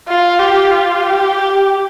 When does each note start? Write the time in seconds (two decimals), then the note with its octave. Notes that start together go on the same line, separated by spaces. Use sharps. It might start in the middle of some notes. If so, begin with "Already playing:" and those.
0.08 F4
0.39 G4
0.71 F4
1.03 G4
1.35 G4